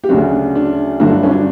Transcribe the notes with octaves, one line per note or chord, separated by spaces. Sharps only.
G4
D2 C#3 F#3 D4 F#4
D4
G1 G2 D3 F#3 D4 F#4
C#4
D4